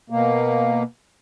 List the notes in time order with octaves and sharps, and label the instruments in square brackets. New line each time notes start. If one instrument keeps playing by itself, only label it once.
[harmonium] B2 A#3